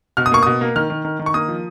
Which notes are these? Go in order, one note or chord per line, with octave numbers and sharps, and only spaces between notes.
B2 F6
D#6
A#3 C#6
B2 D#6
A#3
D#3 F6
D#3
D#3
D#3
C#6
A#3 D#6
F3